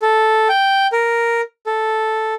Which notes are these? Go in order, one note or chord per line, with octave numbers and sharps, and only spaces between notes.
A4
G5
A#4
A4